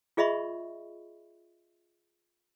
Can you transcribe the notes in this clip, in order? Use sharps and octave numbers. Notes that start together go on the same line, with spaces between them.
F4 G#4 D#5 E5 B5 C#6